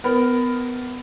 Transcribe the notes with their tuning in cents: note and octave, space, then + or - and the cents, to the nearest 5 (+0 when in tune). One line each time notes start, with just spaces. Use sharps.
B3 +20 A#4 +5